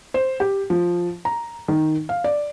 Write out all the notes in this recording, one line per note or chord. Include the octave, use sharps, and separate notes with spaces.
C5
G4
F3
A#5
D#3
F5
D5